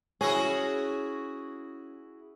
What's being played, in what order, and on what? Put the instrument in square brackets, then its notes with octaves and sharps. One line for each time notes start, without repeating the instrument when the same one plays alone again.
[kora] C#4 [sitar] E4 F#4 G#4